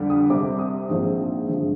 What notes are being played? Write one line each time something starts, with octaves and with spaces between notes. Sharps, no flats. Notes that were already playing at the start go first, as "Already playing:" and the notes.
Already playing: F2 D3 G3
D#6
C2 C3 G3 C4 D6
D#6
A#1 G#2 F3 C4
G#1 G2 D3 F3 G#3